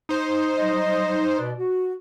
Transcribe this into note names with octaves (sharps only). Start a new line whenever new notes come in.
D#4 C5
F#3 G3 D#5
B2 B4 D5
F#4